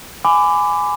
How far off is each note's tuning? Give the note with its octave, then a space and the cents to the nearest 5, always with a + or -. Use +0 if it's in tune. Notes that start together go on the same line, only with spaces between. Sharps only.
G#5 +0 B5 +30 D6 +0